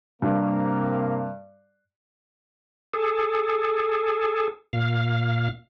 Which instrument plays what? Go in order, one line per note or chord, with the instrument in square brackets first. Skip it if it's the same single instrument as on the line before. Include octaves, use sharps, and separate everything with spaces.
[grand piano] G2 [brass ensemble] C3 A#3
[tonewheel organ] G#4 A4
A#2 F5